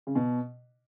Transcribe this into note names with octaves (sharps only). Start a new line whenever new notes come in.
C#3
B2